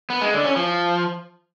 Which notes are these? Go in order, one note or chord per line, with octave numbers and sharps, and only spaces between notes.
B3
G#3
D3
C#4
F3